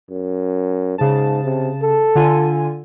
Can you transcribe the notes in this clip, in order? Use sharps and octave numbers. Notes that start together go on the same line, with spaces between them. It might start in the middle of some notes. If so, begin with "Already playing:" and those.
F#2
G#2 C#3 A5
C3
A4
D3 F4 G#5